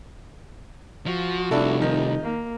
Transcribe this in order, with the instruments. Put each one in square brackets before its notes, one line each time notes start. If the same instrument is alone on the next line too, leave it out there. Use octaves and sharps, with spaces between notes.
[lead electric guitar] F3 [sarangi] F#4
[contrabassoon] F1 [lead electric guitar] C2 [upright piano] D4 E4 A4
[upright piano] D#3 [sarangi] D#4
[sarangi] A#3